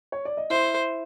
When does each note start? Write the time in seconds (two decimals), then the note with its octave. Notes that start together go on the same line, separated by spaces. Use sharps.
0.12 C#5
0.25 D5
0.37 D#5
0.50 E4 C5 E5